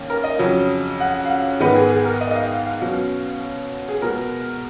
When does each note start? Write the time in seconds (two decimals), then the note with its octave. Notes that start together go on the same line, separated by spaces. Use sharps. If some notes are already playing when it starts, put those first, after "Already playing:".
Already playing: D#2 D#3 A#3 C#4
0.10 A#4
0.24 D#5
0.39 F2 C#3 F#3
1.00 F#5
1.25 F5
1.30 F#5
1.60 G#2 D#3 G#3 B3 D#4 B4
1.75 G#4
1.90 G#4
2.05 A#4
2.21 D#5
2.31 D#5
2.35 F5
2.51 F5
2.66 F5
2.81 B2 F#3 C#4
3.89 G#4
4.02 B2 G#3 B3 A#4